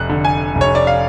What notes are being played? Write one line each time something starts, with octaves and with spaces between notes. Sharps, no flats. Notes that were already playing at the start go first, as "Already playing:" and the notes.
Already playing: F1 F#6
D3
G#5
F1
C#5
D5
F5